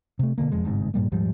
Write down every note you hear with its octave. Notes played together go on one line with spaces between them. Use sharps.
C3 A3
B2 D3 D#3 A#3
E1 F2 G#3
G1 G#2 C3
G2 A#2 G3 A#3
D#1 G#2 F3 G3